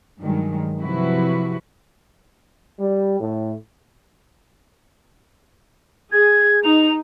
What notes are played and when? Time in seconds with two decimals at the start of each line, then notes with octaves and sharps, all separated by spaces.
0.19 G2 D#3 F#3 G#3
0.79 C3 F3 F#3 E4 F#4 B4
2.79 G3
3.20 A2
6.12 G#4 G#6
6.64 D#4 F7